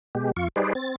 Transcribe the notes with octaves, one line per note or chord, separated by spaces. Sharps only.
B2 G#3 G4
F2 F4 C#6
G3 D#4 G#4 B4 C5 D5
C4 A6